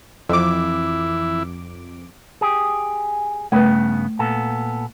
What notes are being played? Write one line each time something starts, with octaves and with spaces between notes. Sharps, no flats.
F2 E3 E4 D6
G4 G#4
G2 C#3 A3 B3 B4
A#2 B3 A4